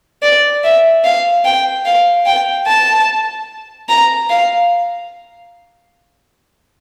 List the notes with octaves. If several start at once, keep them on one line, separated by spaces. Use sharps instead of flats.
D5
E5
F5
G5
F5
G5
A5
A#5
F5